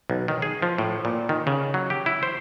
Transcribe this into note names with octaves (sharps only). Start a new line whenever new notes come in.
B1
D#3
G#4
F3
A2
A#2
D#3
C#3
F#3
G4
E4
C5